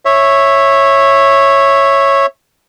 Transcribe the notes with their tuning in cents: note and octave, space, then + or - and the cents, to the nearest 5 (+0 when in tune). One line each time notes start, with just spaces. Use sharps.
C#5 -10 E5 +0